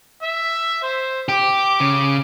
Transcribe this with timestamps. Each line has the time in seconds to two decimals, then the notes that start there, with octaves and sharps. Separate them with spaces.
0.22 E5
0.83 C5
1.29 G4 D6
1.80 C#3